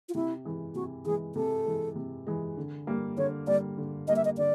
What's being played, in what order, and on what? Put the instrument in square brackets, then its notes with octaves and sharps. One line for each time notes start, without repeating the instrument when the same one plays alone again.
[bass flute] F4
[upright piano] C3 [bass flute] E4
[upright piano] E3 G#3
[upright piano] C3 [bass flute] F#4
[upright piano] E3 G#3 [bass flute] G#4
[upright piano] C3 [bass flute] A4
[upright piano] E3 G#3
C3
E3 G#3
D3
G3 A#3
[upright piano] D3 [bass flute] C#5
[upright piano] G3 A#3 [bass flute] D5
[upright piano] D3
[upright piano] G3 A#3 [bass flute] D#5
[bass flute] E5
D#5
[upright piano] D3 [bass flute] D5